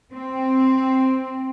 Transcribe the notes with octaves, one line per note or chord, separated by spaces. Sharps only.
C4